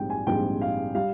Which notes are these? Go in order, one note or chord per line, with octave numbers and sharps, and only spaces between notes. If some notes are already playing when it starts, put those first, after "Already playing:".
Already playing: A#1 G#2 G3 C4 G5
G#5
A#1 G#2 G3 C4 G5
F5
G3 F5